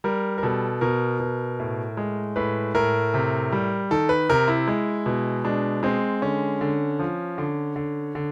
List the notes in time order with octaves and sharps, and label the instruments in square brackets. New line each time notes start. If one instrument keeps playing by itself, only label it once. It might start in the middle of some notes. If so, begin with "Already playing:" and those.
[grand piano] G3 A#4
A#4
B2 A4
B2 A#4
B2
A2
G#3
A2 B4
A2 A#4
C3
G3
D#3 A4
B4
C3 A#4
E4
G#3
B2
G#3 D4
G#3 C4
D3 C#4
D3
F3
D3
D3
D3